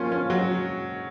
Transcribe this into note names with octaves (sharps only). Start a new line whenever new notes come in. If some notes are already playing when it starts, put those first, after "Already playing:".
Already playing: F3 A#3 C#4 F4
C#4
F#3